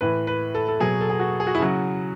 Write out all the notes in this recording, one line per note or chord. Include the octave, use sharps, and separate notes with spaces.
A2 E3 B4
B4
A4
A4
B2 F#3 G#4
A4
G#4
F#4
G#4
F#4
E4
C#3 F#3 F#4